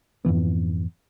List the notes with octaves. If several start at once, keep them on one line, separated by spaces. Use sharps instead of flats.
F2 G#2 E3 B3